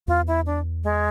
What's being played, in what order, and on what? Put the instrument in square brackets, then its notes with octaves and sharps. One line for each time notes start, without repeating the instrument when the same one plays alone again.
[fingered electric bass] E2 [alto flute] F4
[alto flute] E4
D4
G#3